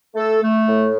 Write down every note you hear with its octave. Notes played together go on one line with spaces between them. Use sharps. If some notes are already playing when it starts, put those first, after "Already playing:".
A3 A4
A3
A2